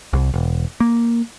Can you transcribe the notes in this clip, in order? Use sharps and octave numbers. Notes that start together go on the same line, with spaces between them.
C2
E1
A#3